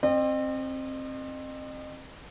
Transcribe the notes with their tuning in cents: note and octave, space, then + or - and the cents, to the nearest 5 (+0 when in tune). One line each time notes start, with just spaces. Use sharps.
C4 +20 D#5 -40